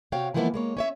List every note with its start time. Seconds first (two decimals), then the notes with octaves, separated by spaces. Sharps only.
0.12 C3 F#4 C#5 F5 G5
0.34 E3 F3 G#3 A#3 B3 E4
0.54 G#3 A#3 C#5
0.77 C#4 C#5 E5